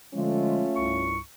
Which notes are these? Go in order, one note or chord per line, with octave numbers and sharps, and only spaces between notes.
D3 F3 G#3 A3 C#4 F4
C2 G2 C#6